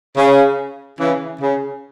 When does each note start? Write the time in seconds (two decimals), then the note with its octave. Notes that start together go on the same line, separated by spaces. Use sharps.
0.17 C#3
1.00 C#3 E3
1.42 C#3